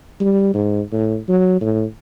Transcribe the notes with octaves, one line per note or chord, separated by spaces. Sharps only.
G3
G#2
A2
F#3
A2